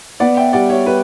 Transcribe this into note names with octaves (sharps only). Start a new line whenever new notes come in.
B3 D5 F#5
E5 G5
G3 D5 F#5
C#5 E5
G3 B4